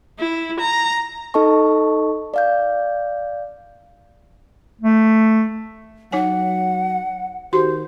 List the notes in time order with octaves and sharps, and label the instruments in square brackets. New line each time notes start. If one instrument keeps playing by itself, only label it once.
[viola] E4
A#5
[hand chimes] D#4 A4 D#5 A5 C#6
D5 F5 G6
[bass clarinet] A3
[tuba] F#3 [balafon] D#4 C#5 G#5 [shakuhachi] F#5
[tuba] D#3 [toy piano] F#4 G4 [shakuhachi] C5 [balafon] C6